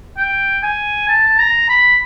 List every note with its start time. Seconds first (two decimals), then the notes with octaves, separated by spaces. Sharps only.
0.17 G5
0.63 G#5
1.08 A5
1.27 A5
1.39 A#5
1.69 B5